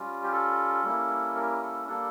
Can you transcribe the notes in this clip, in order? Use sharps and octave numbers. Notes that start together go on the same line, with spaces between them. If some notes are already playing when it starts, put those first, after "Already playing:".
Already playing: G3 C#4 F4
G4
A4
G3 A#3 C#4 E4
A#4
A4
G3 A#3 D4 A4